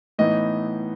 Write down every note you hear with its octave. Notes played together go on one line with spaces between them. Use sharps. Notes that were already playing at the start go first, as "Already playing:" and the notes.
A2 E3 B3 D#4 D#5